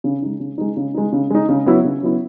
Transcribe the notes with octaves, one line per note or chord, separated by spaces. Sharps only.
C#3
G#3 D#4
C#3
G#3 D#4
C#3
G#3 D#4
C#3
G#3 D#4
C#3
F#3 B3 E4
C#3
F#3 B3 E4